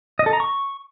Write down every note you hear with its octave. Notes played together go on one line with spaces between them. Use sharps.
D#5
A4
A#5
C#6